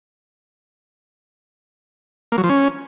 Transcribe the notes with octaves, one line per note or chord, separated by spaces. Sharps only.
A#3
F#3
F3
C#4